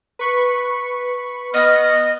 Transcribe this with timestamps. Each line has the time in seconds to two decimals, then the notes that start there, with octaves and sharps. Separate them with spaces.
0.19 B4 B5 C#6
1.54 B3 D#5 F6